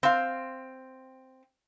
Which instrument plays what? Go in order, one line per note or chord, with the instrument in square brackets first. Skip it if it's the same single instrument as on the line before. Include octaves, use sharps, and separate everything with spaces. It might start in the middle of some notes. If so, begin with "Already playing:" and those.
[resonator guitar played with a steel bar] C4 F5